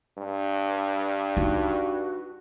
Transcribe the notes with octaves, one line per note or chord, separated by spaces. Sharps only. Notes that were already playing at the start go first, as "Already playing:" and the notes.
G2
D#4 F#4